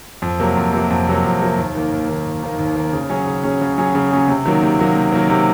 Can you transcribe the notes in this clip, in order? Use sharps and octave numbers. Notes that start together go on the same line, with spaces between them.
F2
C3 F#3 A#3
F2
C3 F#3 A#3
F2
C3 F#3 A#3
F2
C3 F#3 A#3
D#2
D#3 A#3
D#2
D#3 A#3
D#2
D#3 A#3
D#2
D#3 A#3
C#3
F#3 C#4 G#4
C#3
F#3 C#4 G#4
C#3
F#3 C#4 G#4
C#3
F#3 C#4 G#4
C3
D#3 F#3 A#3
C3
D#3 F#3 A#3
C3
D#3 F#3 A#3
C3